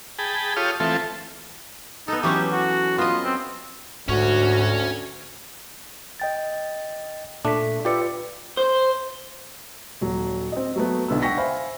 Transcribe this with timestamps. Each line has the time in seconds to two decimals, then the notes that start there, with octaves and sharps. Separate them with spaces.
0.19 G#4 G5 A5 B5
0.56 F4 G4 A4 C#5 D#6 F6
0.80 E3 A3 C4 F4 A4
2.08 B3 D#4 A4
2.23 E3 F#3 C#4 G4
2.52 F#4
2.98 B3 F4 D#5
3.24 C4
4.08 D2 G#2 C#4 F#4 C#5
6.20 D#5 G5 A6
7.45 A#2 A3 D4 A4 B6
7.85 F4 G4 B4 D5 E5 C#7
8.57 C5
10.01 D#1 F#3
10.52 C4 D#5
10.76 F#3 A3 B3
11.08 B1 D3 B3 E6
11.22 F#5 G5 C#6 A#6 B6
11.37 C5 E5 F5 G#5 B5